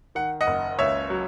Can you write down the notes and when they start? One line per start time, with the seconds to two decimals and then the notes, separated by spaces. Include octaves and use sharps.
0.15 D#3 F#5
0.41 D#5 F#5
0.47 F#1
0.79 C#2 C#5 E5
1.10 F#3